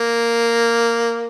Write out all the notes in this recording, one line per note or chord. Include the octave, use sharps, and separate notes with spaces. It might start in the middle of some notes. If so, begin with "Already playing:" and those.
Already playing: A#3